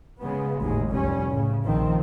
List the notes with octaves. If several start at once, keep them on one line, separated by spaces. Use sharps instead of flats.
C#3 G#3 B3
G#1 D#2 A2 G#3
F1 C2 G3 C#4
A2 C#3
A#1 D#3 F3 C4